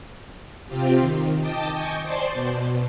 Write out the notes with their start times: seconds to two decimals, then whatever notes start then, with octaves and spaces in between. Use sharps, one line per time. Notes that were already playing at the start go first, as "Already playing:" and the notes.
0.67 C3 C4 F4 G4
1.00 D#3
1.41 D#5 G5 A5 D6
1.73 D#5 G#5 C#6 G6
2.04 C5 D5 A5 C6
2.33 B2